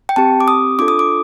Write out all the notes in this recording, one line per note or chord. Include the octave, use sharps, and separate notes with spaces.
G5
C4 G4 A5
D6
D#6
D4 F4 A4 D6
D#6
D6